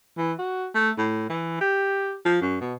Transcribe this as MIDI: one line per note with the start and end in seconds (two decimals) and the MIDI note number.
0.18 0.33 52
0.39 0.67 66
0.75 0.90 57
0.98 1.26 45
1.30 1.59 52
1.61 2.14 67
2.25 2.40 53
2.42 2.59 42
2.61 2.74 47